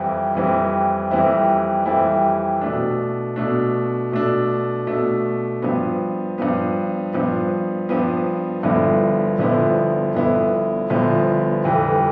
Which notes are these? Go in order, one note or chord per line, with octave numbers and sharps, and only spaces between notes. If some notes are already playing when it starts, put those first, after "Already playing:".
Already playing: F2 E3 G3 C4 E4
F2 E3 G3 C4 E4
F2 E3 G3 C4 E4
F2 E3 G3 C4 E4
B2 A3 D4
B2 A3 D4
B2 A3 D4
B2 A3 D4
G2 F3 B3
G2 F3 B3
G2 F3 B3
G2 F3 B3
G1 G2 F3 B3 E4
G1 G2 F3 B3 E4
G1 G2 F3 B3 E4
G1 G2 F3 B3 E4
G1 F2 E3 G3